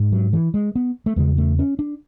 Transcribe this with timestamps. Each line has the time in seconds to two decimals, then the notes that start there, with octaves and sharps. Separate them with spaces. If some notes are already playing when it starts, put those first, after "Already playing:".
Already playing: G#2
0.12 F#3
0.33 E3
0.54 G#3
0.75 B3
1.06 A3
1.16 E2 C#3 G#3
1.38 A3
1.59 C#4
1.79 D4